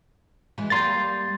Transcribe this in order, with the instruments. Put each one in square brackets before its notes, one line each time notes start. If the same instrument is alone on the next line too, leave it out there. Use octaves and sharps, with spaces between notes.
[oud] E3 G#3
[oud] G3 A#3 [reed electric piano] C6 A6